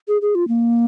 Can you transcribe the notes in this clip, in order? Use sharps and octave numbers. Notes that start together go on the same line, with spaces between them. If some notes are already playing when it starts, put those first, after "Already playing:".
G#4
G#4
F4
A#3